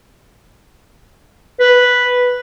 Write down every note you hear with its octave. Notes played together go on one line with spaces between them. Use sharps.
B4